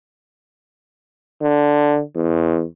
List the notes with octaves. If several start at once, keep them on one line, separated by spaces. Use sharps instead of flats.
D3
E2